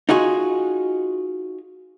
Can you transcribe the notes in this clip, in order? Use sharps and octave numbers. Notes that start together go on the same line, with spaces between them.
D#4 F4 F#4 G#4